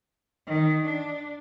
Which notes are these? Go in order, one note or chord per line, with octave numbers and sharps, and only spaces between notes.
D#3
D4